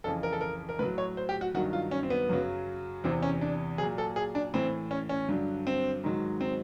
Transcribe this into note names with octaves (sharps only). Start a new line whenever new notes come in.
F2 C#3 E3 A4
A#4
A4
A#4
A#4
A2 F#3 B4
C#5
C5
G4
F#4
G2 D#3 F#3 F#4
F4
C#4
C4
B3
F#2 C#3 F#3
E2 C3 E3 C4
C#4
D4
F#3 G#4
A#2
A4
G#4
D4
A2 E3 C4
C#4
C#4
G2 D3 F#3
C4
G#2 D#3 F#3
C4